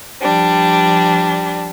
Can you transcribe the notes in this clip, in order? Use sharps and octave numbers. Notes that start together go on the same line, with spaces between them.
F3 G3 D4